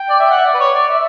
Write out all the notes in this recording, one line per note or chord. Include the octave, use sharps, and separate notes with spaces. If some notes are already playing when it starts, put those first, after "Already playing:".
Already playing: G5
D5
E5
F#5
E5
D5
B4
C#5
D5
E5